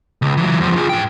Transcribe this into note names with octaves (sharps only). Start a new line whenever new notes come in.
C#2
E3 F#3
E2 F3
F4 G#4
G#2 G5